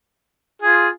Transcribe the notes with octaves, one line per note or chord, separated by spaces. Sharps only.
F4 G#4